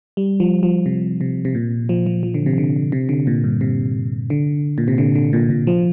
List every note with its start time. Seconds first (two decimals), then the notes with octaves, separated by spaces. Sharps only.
0.17 G3
0.40 F3
0.63 F3
0.86 C3
1.21 C3
1.45 C3
1.55 A#2
1.89 F3
2.06 F3
2.23 F3
2.34 D3
2.46 C3
2.58 D3
2.92 C3
3.09 D3
3.27 A#2
3.44 G2
3.61 C3
4.30 D3
4.78 A#2
4.88 C3
4.98 D3
5.15 D3
5.33 A#2
5.50 A#2
5.67 F3